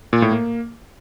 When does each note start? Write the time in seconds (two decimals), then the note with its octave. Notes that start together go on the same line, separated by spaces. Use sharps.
0.13 A#2
0.22 A2
0.32 A#3